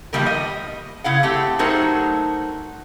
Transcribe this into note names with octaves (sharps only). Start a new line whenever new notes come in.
B2 D#3 F3 G3 A#3 A#4
D#5
C#3 E4 F5 F#5
A3 C4 G4
F#3 A3 D#4 F#4 A#4 C5